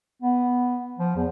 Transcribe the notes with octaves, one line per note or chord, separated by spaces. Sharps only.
B3
F3
E2